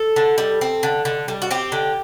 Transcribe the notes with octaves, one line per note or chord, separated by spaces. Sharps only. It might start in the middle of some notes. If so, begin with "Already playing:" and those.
Already playing: A4
D3
G3
C4
D3
D3
G3
F#4
C4 G4
D3